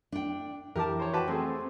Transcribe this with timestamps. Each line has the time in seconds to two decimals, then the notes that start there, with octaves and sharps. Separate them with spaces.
0.12 D4 G5
0.76 F2 E3 G4 A#4 A5 D6
0.99 C5 C#5
1.14 F#4 B4 G5 A5 D6
1.28 A3 C4 G#4 C5 C6